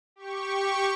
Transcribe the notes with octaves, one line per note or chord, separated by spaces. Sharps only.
G4 C#6